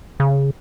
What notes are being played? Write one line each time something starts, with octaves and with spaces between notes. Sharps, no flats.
C#3